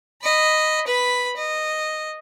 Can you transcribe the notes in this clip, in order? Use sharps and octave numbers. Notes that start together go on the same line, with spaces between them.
D#5 B5
B4 B5
D#5